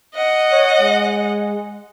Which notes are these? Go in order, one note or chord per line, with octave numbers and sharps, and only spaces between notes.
D#5 F#5
C#5
G#3